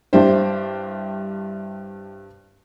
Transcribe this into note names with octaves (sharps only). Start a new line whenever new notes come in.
G2 D4 E4 G4 C5